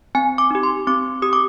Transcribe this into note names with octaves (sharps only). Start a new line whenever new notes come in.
C4 G#5
D6
D#4 G4
C6
C4 D6
G4 D#6
D6